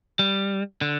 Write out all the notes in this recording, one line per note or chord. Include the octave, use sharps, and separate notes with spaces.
G3
D3